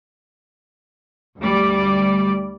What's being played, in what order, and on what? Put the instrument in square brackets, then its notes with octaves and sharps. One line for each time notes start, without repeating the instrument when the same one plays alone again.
[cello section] D2 G3 D5